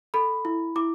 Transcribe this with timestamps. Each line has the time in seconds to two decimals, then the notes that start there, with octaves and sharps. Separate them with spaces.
0.14 A4 B5
0.45 E4
0.76 E4 D6